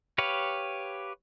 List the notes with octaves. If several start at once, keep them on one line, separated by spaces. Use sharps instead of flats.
G4 B4 C#5 F5